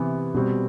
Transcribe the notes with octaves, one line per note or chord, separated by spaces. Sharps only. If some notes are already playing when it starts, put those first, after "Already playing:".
Already playing: C3 E3 B3
B2 G3 C4